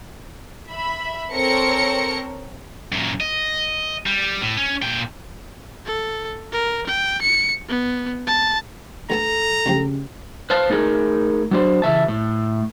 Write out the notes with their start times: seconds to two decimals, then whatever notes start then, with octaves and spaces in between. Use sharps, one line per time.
0.70 E5 B5
1.33 C4 A4 A#4 C#5 A#6 C#7
2.92 F#2 A#2
3.21 D#5
4.06 G3
4.42 A2
4.57 C#4
4.82 A#2 G5
5.86 A4
6.52 A#4
6.87 G5
7.22 C#7
7.69 B3
8.27 A5
9.10 D2 B3 A4 A5 A#5
9.66 D2 C#3 F3 G4
10.50 B4 C5 F5 A5
10.70 A3 D#4 G#4 A#4
11.51 F#3 D4 C5
11.82 C#3 E3 E5 A5
12.08 A2